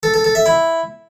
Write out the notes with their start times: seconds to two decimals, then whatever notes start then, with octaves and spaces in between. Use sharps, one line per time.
0.03 A4
0.14 A4
0.24 A4
0.35 E5
0.46 E4